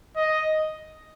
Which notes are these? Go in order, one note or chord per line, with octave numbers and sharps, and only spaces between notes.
D#5